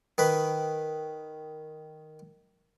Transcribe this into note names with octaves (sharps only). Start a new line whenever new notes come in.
D#3 B4